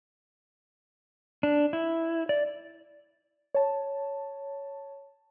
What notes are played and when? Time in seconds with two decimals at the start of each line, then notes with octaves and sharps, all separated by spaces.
1.43 D4
1.73 E4
2.29 D5
3.54 C#5 A5